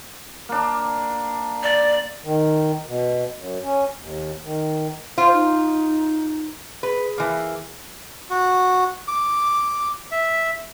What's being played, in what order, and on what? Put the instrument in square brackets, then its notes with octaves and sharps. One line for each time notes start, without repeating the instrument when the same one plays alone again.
[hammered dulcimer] A#3 D4
[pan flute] D5
[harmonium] D#3
B2
F#2
C#4
D#2
D#3
[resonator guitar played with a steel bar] F4 [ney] C5
[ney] D#4
[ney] G#4 [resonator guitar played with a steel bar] B4
[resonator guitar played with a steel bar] E3 A#3
[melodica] F#4
D6
E5